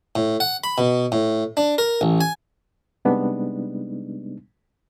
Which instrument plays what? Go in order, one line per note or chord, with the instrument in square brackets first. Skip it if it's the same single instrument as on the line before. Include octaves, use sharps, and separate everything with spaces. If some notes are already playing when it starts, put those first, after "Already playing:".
[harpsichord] A2
F#5
B5
B2
A2
D4
A#4
A1
G#5
[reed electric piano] C3 G3 G#3 B3 D4 D#4